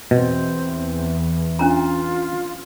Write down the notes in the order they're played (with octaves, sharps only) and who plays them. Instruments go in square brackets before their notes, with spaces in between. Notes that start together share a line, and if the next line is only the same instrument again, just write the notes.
[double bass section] E2 [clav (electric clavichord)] B2 [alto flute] C4
[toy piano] C#4 D4 A#5 [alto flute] F4